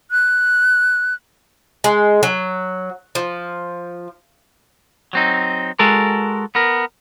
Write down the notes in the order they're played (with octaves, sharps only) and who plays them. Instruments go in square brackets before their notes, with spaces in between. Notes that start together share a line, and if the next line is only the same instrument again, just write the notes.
[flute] F#6
[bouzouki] G#3
F#3
F3
[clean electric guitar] F#3 C4 D#4
G#3 F#4 A4 A#4
B3 A#4